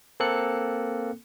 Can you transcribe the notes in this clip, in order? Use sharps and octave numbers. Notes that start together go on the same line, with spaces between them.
A#3 C4 A4 F#6 C#7